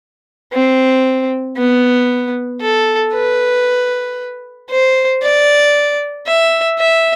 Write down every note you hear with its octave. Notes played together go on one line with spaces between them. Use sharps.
C4
B3
A4
B4
C5
D5
E5
E5